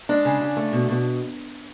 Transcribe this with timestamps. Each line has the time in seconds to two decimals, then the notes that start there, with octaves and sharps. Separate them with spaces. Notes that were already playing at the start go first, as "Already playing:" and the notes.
0.09 G#3 D4
0.25 C#3
0.41 C#3
0.57 A3
0.73 B2
0.89 B2